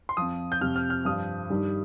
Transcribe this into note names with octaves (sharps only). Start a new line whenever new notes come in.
C6
F2 F3 D#6
G6
F2 C3 F3 F6
F6
F6
G2 F3 D#6
G2 D#3 G3